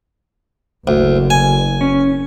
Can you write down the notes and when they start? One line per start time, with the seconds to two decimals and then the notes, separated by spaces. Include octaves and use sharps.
0.87 F#1 D2
1.30 G#5
1.81 C#4